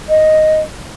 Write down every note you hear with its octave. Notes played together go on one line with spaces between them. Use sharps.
D#5